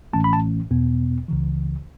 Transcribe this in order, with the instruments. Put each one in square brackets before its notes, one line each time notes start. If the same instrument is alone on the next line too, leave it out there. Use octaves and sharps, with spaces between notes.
[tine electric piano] A1 A2 E3 A3 C#4 A5
B5
A5
E2 B2 B3
C#2 C#3 E3